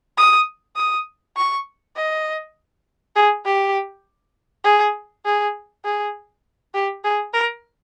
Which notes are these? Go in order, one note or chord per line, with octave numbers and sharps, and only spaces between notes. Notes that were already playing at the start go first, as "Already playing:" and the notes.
D#6
D#6
C#6
D#5
G#4
G4
G#4
G#4
G#4
G4
G#4
A#4